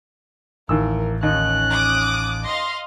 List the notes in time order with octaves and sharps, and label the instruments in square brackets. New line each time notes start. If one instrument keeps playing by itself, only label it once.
[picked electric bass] A1 [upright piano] D#2 E3 E6 [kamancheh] A#4
[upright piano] D#2 D#4 [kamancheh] C#4 F#6
[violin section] D6 D#6
D#5 F5 C6